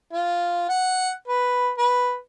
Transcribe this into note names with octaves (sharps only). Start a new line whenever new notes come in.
F4
F#5
B4
B4